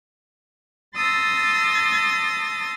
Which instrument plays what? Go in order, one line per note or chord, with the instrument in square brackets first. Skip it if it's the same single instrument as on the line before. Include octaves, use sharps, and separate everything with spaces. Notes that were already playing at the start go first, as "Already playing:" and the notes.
[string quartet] A5 C6 D#6 E6 A6 A#6